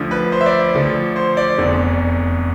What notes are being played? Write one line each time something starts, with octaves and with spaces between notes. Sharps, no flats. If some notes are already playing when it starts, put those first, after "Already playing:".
Already playing: D2 D3 F3
B4
C5
E5
D5
D5
D2 D3 F3
C5
D5
F1 E2 D3